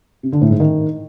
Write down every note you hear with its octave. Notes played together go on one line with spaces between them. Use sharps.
C3
D3
A2
G#2
D#3